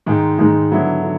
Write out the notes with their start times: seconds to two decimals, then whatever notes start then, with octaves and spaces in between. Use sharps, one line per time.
0.06 G#2 D#3 G#3
0.39 G#2 D#3 G#3
0.71 D3 F#3 B3 E4
1.03 D3